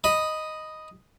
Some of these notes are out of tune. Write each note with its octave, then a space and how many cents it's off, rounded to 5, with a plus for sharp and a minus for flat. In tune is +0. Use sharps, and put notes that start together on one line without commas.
D#5 +0 B5 +0